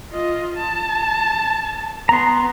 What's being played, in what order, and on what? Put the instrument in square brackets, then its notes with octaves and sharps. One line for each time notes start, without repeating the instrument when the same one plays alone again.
[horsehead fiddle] F4 D#5
A5
[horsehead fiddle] B3 [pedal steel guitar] A#5 C6